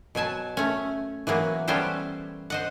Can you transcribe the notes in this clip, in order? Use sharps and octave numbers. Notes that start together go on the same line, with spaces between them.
B2 F#3 G#5 A5
A3 C#4
E3 F#3 A#3 B3
G3 B3 C#4 G4 A4 C5
C5 D#5 F#5